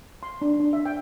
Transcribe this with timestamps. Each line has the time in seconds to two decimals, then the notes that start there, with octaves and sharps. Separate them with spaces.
0.23 C6
0.42 D4
0.60 D4
0.73 E5
0.86 G5